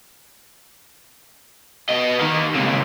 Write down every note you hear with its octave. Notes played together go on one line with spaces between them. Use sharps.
B3 D#5
D#3 A#3
C#2 C3